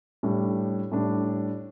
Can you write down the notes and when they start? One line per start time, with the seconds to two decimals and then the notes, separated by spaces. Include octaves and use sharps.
0.23 A2 G3 D4
0.92 A2 G3 D4